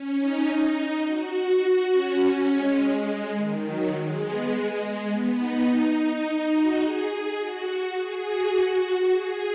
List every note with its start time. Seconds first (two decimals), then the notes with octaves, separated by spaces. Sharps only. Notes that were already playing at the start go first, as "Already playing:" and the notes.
Already playing: C#4
0.18 D#4
1.05 F#4
1.62 F#4
1.91 C#4
2.49 G#3
3.35 D#3
3.64 F#3
3.93 G#3
4.21 B3
4.51 G#3
5.08 B3
5.37 D#4
5.66 D#4
6.52 F#4
6.80 G#4
7.10 G#4
7.38 F#4
7.67 F#4
7.96 G#4
8.24 F#4
9.11 G#4